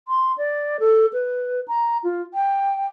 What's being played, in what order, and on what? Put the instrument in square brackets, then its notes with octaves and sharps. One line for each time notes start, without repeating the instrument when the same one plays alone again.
[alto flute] C6
D5
A4
B4
A#5
F4
G5